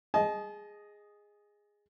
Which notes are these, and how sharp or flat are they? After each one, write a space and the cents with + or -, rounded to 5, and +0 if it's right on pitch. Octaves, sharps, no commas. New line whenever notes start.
G#4 -5 D#5 +0 A5 -40